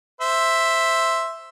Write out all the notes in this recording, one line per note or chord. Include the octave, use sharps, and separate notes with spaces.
C5 E5